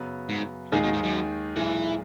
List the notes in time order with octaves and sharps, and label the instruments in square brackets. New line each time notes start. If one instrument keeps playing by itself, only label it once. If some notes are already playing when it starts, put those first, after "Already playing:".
Already playing: [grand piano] F#2 C#3 F#3 B3
[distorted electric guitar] G#2
[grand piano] D#2 D#3 G#3 D#4 G#4 [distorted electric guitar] A#2
[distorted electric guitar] B2
G#2
F#2
[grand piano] B1 A#2 G#3 [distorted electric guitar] E3